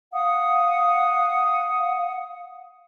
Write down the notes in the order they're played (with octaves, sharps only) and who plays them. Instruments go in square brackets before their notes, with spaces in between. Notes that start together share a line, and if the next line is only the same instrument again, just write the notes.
[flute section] F5 F#5 D#6